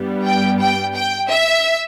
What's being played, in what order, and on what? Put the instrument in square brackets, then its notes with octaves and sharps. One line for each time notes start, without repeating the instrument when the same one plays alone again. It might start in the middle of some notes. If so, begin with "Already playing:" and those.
Already playing: [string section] G2 G3 B3
G5
G5
G5
E5